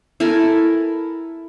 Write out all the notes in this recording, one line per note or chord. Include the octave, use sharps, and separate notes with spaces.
E4 A4 A#4 G#5